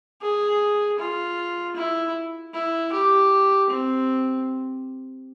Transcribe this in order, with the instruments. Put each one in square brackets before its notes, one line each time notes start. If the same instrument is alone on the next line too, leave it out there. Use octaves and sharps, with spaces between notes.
[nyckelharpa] G#4
F4
E4
E4
G4
C4